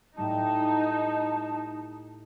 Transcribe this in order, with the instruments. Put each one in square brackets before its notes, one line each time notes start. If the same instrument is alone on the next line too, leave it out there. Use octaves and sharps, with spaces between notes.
[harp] A2 G3 [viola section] D#4 [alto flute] A5